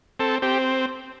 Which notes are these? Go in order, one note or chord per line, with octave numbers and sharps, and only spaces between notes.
C4 A4
C4 G4